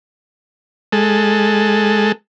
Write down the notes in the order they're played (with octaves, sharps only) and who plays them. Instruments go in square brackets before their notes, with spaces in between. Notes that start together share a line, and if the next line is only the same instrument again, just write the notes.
[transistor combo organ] G#3 A4